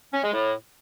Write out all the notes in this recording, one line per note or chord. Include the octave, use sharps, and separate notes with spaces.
C#4
G#3
A2